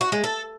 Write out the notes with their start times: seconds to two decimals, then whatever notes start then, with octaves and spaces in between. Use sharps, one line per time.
0.01 F#4
0.12 G#3
0.24 A4